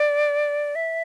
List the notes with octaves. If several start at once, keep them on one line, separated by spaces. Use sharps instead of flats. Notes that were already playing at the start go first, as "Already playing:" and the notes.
Already playing: D5
E5